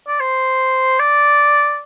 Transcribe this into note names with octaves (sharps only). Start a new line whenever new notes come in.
D5
C5
D5